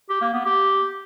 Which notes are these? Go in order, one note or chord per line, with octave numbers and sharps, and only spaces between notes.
G4
A#3
B3
G4